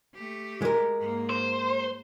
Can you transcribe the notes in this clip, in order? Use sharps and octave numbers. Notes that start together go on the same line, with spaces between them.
A3 G4
G#3 A#4
G#2 A#3
C5